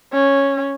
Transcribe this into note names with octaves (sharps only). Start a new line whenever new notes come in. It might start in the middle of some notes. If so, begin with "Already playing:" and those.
C#4